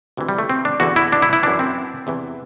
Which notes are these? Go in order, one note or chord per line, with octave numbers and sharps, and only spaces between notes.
D2 C3 E3
G3
A3
C4
D4
E2 D3 F#4
E4
D4
E4
E4
F#2 E3 D4
C4
E2 C3 E3